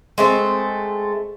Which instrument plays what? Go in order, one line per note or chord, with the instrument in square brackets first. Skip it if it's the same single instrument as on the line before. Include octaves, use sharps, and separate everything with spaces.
[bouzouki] G#3 A3 C4